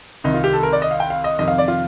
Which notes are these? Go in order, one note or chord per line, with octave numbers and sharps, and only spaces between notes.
C2 C3 D#3 D#4
F4
G4
A4
A#4
D5
D#5
F5
G5
F5
D#5
F2 C3 D#3 D#5
F5
D5
F4